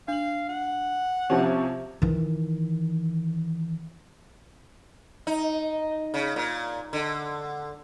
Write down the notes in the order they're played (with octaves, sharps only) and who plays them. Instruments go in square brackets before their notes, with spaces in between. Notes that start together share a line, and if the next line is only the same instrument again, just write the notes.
[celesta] D4 F#7 [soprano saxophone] F5
[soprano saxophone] F#5
[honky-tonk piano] C3 F3 C#4 [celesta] G4 E5 A5
[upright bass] D#3 E3
[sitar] D#4
C#3
A#2
D3